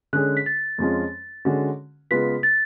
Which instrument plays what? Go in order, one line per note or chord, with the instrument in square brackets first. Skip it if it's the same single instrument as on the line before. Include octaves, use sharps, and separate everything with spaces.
[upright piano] D3 G#3 C#4 G#4 [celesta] F#6
[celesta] B6
A6
[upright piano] F2 F3 G#3 C#4 F4
D3 G#3 C#4 F#4
[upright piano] C#3 G#3 B3 F4 B4 [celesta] B6
[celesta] A6